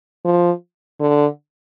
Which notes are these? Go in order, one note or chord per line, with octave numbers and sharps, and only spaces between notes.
F3
D3